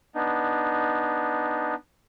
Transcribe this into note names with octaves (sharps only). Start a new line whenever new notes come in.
B3 D4 D#4